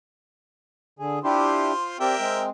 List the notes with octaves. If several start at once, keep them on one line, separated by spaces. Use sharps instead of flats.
D3 G#4
D4 E4 F4 G4 C5
C4 G4 A#4 D5 E5 G5
G#3 C4